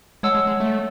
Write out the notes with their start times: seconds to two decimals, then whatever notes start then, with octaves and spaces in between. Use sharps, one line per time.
0.23 G#3 C#5 F#5 A5 E6
0.35 G#3
0.47 G#3
0.60 A3